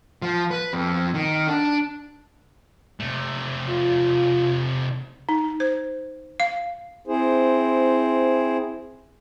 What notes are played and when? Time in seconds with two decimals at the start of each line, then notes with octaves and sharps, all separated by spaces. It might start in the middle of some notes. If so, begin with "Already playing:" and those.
0.22 F3
0.51 B4
0.73 F2
1.14 D#3
1.47 D4
3.00 C3 A3
3.69 F4
5.29 D#4
5.60 C5
6.40 F5
7.07 C4 E4 G#4 C5